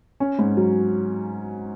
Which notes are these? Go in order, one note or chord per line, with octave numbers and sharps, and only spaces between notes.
C#4
G#2
F#3